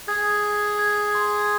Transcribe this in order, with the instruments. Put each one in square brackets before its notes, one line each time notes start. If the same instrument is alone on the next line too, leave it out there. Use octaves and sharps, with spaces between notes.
[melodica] G#4 [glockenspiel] G#6
[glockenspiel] G#6
G#6
C6